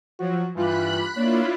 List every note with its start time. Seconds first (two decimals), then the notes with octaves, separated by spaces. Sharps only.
0.20 F3 F#3 F#4
0.56 G2 E3 G3 F4 B5 F#6
1.16 A#3 D4 E4 F4 C#5